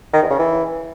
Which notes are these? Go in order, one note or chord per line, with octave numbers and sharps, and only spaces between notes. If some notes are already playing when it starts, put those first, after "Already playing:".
D#3
E2
C#3
E3